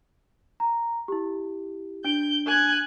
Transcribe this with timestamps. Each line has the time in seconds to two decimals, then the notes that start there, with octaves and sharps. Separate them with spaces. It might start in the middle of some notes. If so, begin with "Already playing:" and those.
0.60 A#5
1.08 E4 G4
2.05 D4 G6 D7
2.46 G#5 F#6 G#6